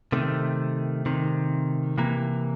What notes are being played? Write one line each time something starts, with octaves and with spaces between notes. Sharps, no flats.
C3 D#3 A3
C3 D#3
C3 E3 A#3